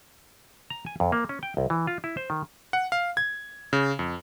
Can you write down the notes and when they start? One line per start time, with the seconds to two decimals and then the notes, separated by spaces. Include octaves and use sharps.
0.70 A#5
0.86 G#5
1.00 F2
1.12 A#3
1.29 C#4
1.43 G5
1.57 C2
1.70 E3
1.87 F4
2.04 E4
2.17 C5
2.30 D#3
2.73 F#5
2.92 F5
3.17 G#6
3.73 C#3
3.99 F2